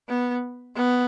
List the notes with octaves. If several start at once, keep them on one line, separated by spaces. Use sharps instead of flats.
B3
B3